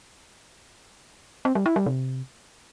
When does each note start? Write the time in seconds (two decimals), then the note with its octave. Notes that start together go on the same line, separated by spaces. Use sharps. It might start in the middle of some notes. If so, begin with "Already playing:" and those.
1.45 C4
1.55 G3
1.66 E4
1.76 G3
1.86 C3